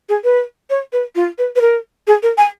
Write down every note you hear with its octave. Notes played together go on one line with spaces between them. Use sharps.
G#4
B4
C#5
B4
F4
B4
B4
A#4
G#4
A#4
G#5